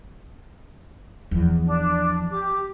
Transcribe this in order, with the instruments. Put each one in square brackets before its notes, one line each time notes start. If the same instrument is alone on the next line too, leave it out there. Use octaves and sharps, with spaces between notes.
[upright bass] E2 F3
[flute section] D4
G4 D6